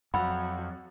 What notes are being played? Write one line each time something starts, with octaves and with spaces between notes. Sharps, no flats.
F2 F#3 F#5 B5